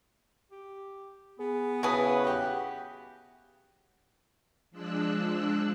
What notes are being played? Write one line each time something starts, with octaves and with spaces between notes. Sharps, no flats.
G4
B3 G#4
C#3 E4 F#4 B4 G#5 D#6
F#4 G4
F3 G#3 D4 E6 F#6